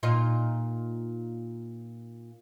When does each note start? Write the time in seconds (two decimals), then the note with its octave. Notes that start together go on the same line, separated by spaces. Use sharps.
0.03 A#2 D#4 F4